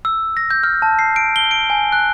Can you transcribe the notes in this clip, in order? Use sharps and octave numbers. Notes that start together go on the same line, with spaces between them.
E6
A#6
G6
F6
A5
C7
D7
G7
D7
G#5
F#6